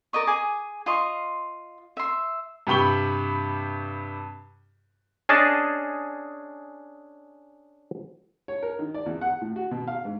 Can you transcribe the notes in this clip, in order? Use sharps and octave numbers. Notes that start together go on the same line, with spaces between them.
A#4 D5 D#5 C#6
G#4 G#5 D6
F4 D#5 C6 C#6
E5 C6
G2 C3 G4 B5 C#6 G7
C#4 D4 G#4 D#5 A5
C#5
A#4
D#3
D5
E2
F#5
A2
F#4
B2
F5
G#2